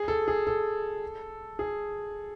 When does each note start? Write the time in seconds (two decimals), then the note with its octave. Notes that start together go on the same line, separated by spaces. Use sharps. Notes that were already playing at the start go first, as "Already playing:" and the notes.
Already playing: G#4
0.08 A4
0.28 G#4
0.47 A4
1.59 G#4